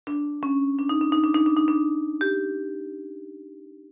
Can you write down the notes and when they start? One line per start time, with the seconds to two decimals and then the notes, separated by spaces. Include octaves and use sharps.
0.07 D4
0.43 C#4
0.79 D4
0.89 D#4
1.01 D4
1.12 D#4
1.24 D4
1.34 D#4
1.46 D4
1.57 D#4
1.68 D4
2.21 G4